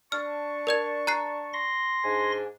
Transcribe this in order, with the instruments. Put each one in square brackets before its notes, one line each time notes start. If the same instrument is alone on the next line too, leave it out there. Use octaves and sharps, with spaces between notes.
[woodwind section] D4 A5 C#6 [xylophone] F6
[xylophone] A#4 D5 G#6
A#5 F#6 C7
[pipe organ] C6 A#6
[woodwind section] G#2 D4 G#5